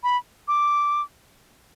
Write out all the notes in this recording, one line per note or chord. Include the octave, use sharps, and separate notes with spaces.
B5
D6